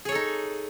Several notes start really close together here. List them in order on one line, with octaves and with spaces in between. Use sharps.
G#4 C#5 A4 D#4